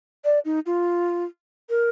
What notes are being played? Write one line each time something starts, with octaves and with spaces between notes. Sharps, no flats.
D5
D#4
F4
A#4